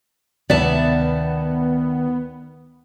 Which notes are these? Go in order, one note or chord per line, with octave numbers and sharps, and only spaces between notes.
D2 C3 D#3 G#3 B3 D5 E5 A5